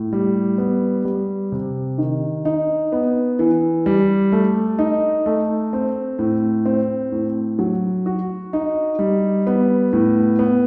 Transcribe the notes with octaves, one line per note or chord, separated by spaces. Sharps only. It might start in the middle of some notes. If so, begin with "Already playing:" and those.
Already playing: A2
G3
B3
G3
C3
D#3
D#4
B3
E3
G3
A3
D#4
A3
C4
A2
C4
A2
F#3
F#4
D#4
G3
B3
A2
B3